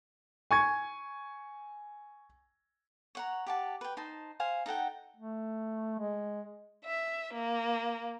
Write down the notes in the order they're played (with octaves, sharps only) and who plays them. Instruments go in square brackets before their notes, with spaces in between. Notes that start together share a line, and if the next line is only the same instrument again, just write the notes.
[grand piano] G#5 C#6 G#6
[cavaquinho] C#5 F#5 A#5
G4 F#5 A5
B4 G5
D#4 C5 A5
C5 F5 G#5
D#4 A4 F#5 G5
[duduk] A3
G#3
[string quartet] E5
A#3